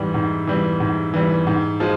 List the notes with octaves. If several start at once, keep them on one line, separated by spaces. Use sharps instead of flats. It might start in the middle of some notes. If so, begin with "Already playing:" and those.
Already playing: G#2 E3 G3
G#2
E3 G3
G#2
E3 G3
G#2
F3 G#3